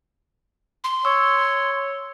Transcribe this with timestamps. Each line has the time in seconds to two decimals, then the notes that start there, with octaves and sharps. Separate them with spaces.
0.84 C6
1.05 C#5 C#6 E6